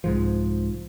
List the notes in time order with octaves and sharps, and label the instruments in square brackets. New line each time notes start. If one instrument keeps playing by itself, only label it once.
[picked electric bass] C2 G#2 F3